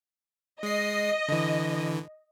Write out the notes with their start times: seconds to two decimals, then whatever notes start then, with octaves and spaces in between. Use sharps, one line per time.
0.63 G#3 D#5 C7
1.28 D3 E3